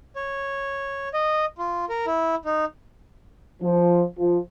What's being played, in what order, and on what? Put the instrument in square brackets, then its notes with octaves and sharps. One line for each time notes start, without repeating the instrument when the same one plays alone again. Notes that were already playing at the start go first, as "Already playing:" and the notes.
[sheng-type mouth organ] C#5
D#5
F4
A#4
E4
D#4
[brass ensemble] F3
F3